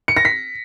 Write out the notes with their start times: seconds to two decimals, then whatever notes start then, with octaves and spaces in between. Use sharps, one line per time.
0.08 C#7
0.17 A#6
0.25 B6